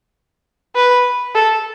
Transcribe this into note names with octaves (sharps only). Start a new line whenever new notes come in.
B4
A4